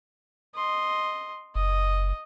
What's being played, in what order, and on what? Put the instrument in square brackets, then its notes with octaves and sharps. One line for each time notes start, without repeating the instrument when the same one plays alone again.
[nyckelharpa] D#5 C6
[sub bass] F#1 [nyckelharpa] D#5